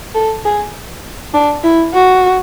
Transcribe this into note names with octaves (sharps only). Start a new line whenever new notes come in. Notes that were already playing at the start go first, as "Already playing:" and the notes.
A4
G#4
D4
E4
F#4